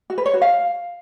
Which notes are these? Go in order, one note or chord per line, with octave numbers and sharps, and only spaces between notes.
F#4
B4
C#5
F#4
F5